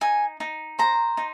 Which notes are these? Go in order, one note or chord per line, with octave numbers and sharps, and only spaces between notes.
D#4 G#5
D#4
C5 A#5
D#4